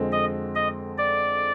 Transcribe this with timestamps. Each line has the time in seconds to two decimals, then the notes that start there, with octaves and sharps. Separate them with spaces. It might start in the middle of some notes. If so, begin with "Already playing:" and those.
Already playing: F2 D3 G#3 C4
0.12 D#5
0.55 D#5
0.98 D5